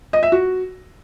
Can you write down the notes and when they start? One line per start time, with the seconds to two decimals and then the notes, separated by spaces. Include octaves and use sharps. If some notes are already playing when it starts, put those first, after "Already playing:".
0.13 D#5
0.23 E5
0.32 F#4